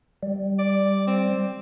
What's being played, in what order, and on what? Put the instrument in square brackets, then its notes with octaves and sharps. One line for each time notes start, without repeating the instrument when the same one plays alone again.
[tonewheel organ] G3
[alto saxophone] D5
C4